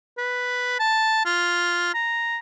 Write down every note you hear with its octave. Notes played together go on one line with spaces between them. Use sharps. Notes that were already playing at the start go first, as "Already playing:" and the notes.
B4
A5
F4
A#5